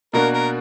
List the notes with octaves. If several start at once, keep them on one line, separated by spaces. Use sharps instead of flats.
B2 A#3 D4 F#4 A#4
A#4